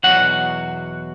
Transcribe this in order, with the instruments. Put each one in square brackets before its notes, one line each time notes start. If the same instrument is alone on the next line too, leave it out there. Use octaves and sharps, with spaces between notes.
[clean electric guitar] E2 B2 F#3 F#4 F#5